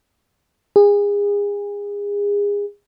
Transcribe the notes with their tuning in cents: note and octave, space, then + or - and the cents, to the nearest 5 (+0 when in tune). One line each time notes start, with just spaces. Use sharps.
G#4 -30